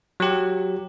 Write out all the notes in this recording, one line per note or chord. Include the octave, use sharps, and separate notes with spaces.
F#3 G4